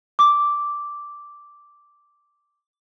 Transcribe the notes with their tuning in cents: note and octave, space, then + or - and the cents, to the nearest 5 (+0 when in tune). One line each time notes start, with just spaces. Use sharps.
D6 -5